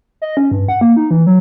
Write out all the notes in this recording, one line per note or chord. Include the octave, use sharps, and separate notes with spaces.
D#5
C#4
G2
F#5
A#3
D#4
E3
F#3